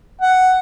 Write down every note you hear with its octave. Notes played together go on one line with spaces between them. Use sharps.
F#5